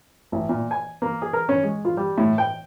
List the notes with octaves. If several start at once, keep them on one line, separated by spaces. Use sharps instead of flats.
A1
A#2
G#5
A#3
G#4
A#4
C#4
G#3
F4
G3
A2
G5